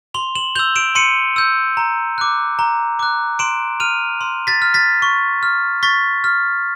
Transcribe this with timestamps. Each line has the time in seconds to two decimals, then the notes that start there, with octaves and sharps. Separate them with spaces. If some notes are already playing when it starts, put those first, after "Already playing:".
0.14 C6 F7 G7
0.35 E7 F#7
0.55 E6 G6 F7 G7
0.76 D7 E7
0.95 C6 C#7 D#7
1.36 E6 G6
1.77 A#5
2.18 D6 F#6
2.59 A#5
2.99 D6 F#6
3.39 C6 D7 E7
3.80 F6 D#7 F7
4.21 C6
4.47 A6 B6
4.62 F6
4.74 A6 B6
5.02 C#6
5.43 F6
5.83 C#6 A6 B6
6.24 F6